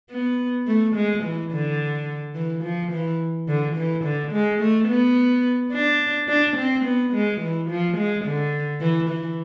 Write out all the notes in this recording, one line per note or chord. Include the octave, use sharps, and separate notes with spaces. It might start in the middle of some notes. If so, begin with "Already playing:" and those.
B3
A3
G#3
E3
D3
E3
F3
E3
D3
E3
D3
G#3
A3
B3
D4
D4
C4
B3
G#3
E3
F3
G#3
D3
E3
E3